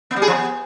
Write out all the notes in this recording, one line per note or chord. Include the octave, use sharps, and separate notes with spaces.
B3
G3
G#4
F3
B3